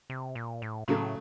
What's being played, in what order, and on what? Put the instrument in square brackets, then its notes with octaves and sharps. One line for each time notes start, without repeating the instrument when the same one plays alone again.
[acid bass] C3
A#2
A2
[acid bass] A2 [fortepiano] C#3 F#3 A3